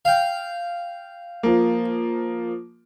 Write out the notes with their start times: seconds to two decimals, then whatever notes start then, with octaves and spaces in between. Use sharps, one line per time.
0.05 F5 G5
1.43 F3 A#3